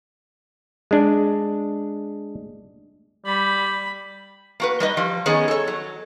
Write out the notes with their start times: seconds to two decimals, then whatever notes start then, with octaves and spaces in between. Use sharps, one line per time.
0.91 G#3 D4
3.26 G3 B5
4.60 A#3 F#4 B4
4.80 G3 B4 D#5
4.97 F3 G3
5.26 D#3 B3 C#4 G#4 D#5
5.48 A4 C#5
5.68 F#3